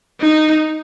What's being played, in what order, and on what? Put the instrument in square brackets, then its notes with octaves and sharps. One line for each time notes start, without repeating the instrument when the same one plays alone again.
[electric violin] D#4